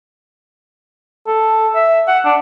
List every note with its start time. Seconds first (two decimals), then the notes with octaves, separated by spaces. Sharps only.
1.27 A4
1.75 E5
2.08 F#5
2.25 D4